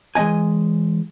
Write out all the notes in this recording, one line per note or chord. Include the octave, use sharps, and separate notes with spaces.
E3 G#3 C4 D#5 G#5